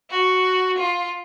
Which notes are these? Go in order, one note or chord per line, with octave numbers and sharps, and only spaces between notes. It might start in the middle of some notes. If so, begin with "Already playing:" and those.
F#4
F4